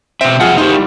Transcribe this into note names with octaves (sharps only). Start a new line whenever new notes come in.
B2 C4 E5
F2 C3 F#3 F4 G#4 F#5
D#4 G4 C5
E3 G3